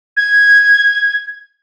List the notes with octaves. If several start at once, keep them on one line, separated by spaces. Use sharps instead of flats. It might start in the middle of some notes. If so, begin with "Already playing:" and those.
G#6